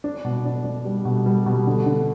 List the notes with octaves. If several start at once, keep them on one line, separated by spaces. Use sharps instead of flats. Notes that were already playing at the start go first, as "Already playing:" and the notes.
D4
B2
D4
D4
G3
B2
G3
B2
D3
D3